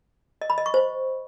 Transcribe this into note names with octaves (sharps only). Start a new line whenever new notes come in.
D#5
B5
D#5
C#6
C5